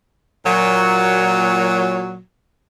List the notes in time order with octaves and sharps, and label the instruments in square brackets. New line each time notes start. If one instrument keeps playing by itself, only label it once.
[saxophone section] A#2 F#3